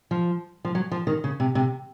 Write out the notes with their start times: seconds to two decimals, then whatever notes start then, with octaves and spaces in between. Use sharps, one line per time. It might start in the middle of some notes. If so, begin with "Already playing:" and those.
0.11 F3
0.65 F3
0.75 F#3
0.91 F3
1.07 D#3
1.24 C#3
1.40 C3
1.55 C3